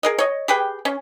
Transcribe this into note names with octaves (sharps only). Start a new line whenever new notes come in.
G#4 A#4 D#5
C#5 D#5
G4 G#4 B4 G5
C#4